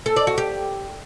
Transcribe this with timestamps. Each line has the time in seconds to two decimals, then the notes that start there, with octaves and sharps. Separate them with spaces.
0.06 A4
0.16 D5
0.27 F#4
0.38 G4